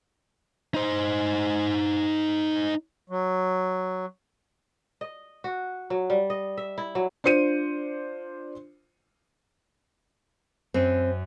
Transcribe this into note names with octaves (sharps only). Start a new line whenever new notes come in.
D#4 C5
F#3
D#5
F#4
F#3
G3
D#5
E5
E4
F#3
D4 F4 C5 C#7 D#7
F#2 C4 D#7